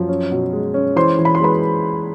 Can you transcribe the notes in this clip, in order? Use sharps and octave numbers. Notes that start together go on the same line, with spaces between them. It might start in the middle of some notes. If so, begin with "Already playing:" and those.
Already playing: F#2 F3
C#4
B2
G#3
C#4
E3 C5 C6
E3
B5
C6
G#3 B4 B5